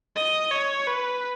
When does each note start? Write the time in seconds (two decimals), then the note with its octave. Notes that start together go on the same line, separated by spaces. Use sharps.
0.16 D#5
0.51 C#5
0.87 B4